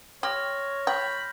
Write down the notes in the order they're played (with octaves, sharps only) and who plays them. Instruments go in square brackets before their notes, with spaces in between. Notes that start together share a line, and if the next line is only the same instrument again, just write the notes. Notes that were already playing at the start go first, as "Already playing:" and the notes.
[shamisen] G4 [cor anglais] C#5 [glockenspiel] C6 F6 A#6
[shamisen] G5 [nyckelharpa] B5 [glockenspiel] G6